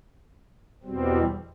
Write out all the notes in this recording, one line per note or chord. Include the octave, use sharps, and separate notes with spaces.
E2 B2 G3 C4